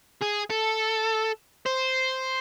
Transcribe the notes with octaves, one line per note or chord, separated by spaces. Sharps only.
G#4
A4
C5